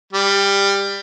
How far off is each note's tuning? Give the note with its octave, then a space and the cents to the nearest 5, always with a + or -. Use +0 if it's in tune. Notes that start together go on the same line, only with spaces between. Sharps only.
G3 +20